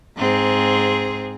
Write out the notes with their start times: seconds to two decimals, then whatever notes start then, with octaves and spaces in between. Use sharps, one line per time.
0.17 G#2 C4 G#4